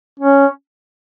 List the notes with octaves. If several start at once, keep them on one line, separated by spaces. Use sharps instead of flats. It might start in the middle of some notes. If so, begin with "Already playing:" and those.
C#4